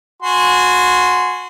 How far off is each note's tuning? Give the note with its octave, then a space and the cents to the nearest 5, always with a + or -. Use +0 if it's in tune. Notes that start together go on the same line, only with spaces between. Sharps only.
F#4 -25 G#5 +0 C6 -20